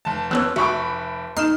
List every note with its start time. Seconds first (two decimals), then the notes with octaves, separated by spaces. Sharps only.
0.05 F1 A5
0.31 E3 B3 C#4 E6 F#6
0.56 F1 F#4 E5 B5 C#6 D6
1.37 D#4 C6 F6 E7